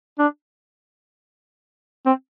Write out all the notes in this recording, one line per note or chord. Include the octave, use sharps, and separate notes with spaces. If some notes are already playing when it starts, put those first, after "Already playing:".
D4
C4